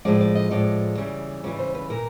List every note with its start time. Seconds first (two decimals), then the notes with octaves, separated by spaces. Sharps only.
0.05 A2 F3 G#3 D5
0.20 D5
0.35 D#5
0.51 A2 F3 G#3 D5
0.97 C#3 E3 G3
1.44 C#3 E3 G3 D5
1.59 C5
1.75 B4
1.90 A#2 A#4